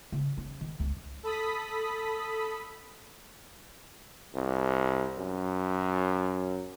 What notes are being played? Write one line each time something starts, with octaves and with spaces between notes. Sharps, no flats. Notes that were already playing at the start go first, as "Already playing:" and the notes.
C#3
C#4
D#3
C#2
A4 B5 D#6 B6
C2
F#2